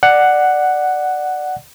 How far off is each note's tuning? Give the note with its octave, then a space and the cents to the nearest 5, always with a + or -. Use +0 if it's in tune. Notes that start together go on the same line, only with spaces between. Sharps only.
D5 +10 F#5 +5